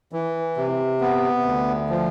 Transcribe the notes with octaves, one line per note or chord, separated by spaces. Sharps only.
E3
C3
B3
D2
F3